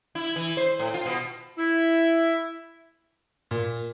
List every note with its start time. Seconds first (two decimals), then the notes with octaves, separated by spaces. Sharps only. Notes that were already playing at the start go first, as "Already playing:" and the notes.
0.15 E4
0.36 E3
0.57 C5
0.79 A2
0.94 F4
1.06 B2
1.58 E4
3.51 A#2